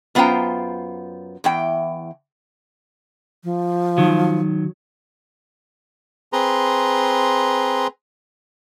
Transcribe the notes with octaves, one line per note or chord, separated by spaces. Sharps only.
F#2 B3 F4 C5 G5 A#5
E2 E3 G5
F3
D#3 F#3
C4 G#4 B4 A#5 C6